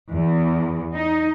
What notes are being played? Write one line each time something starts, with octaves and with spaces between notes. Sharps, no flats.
E2
D#4